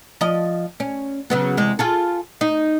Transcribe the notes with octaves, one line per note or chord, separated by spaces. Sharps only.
F3 D#5
C#4
C#3 F#3 B3
E2 C3 G#3
F4 G#4 A4
D#4